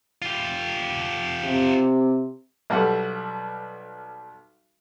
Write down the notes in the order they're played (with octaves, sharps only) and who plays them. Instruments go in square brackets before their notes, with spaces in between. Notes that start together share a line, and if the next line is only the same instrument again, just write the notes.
[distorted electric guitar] F4 G4
[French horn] C3
[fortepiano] B1 G3 A4 F#5